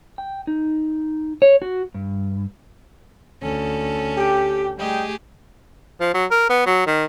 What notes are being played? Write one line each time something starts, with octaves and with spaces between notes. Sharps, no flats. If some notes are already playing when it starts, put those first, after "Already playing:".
G5
D#4
C#5
F#4
G2
D2 C#4 A4
G4
G3 A3 G4 G#4 D#5 G5
F3
F#3
A#4
B3
F#3
D#3